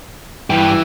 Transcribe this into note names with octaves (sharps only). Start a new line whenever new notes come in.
G2 E3 G4